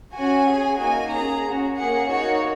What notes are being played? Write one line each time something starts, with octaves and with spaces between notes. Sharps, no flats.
C#4 F#4 G#5
C#4 G#4
A#3 D#4 F#4 G#5
C#4 G#4 A#5
C#4 F#4
A#3 C#4 G#4 F#5
A#3 D#4 F#4 C#5